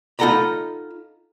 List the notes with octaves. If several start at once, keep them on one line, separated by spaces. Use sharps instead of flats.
D#4 F4 A4 F#5 A#5 B5